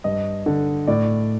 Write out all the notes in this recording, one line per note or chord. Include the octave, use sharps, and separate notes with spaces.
G2 D#5
D3
A2 D5